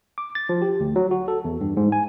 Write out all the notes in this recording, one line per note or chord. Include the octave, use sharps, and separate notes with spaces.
D6
A6
F3
G4
D2
F#3
F#4
A4
E2
G2
G#2
G#5